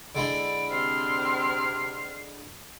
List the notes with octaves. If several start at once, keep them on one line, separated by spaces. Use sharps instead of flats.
D3 G#3 E4 D7
C3 C4 F6 C7